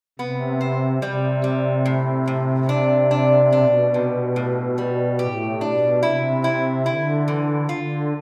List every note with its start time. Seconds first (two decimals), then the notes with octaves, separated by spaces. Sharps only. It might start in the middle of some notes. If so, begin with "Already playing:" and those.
0.19 C3 B3
0.61 C5
1.02 C3 G3
1.44 G3
1.86 A2
2.28 A2
2.69 D4
3.11 D4
3.52 B2 D4
3.94 C3
4.36 A2
4.78 G3
5.19 A2 G4
5.61 B2 D4
6.02 C3 E4
6.44 E4
6.86 D3 E4
7.28 E3
7.69 D3 F4